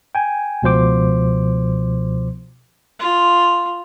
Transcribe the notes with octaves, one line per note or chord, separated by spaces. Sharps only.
G5 G#5
C#2 B2 F3 C5 D6
F4